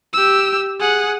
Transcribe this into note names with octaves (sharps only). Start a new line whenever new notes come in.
G4 E6
G#4 F#5